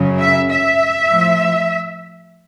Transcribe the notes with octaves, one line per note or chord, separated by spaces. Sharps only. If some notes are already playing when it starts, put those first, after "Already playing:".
Already playing: F#2 C#3 F#3
E5
E5
A2 F3